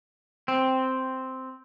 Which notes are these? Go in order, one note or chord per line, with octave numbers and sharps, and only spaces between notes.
C4